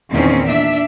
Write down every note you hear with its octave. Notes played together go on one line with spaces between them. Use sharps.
E2 A#2 D#3 C4 C#4
D4 E5